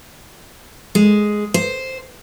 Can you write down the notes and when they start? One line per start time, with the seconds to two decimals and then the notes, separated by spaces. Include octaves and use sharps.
0.95 G#3
1.54 C5